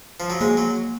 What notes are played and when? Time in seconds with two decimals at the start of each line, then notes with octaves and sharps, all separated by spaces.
0.20 F3
0.30 F#3
0.40 G#3 A#3
0.57 F#3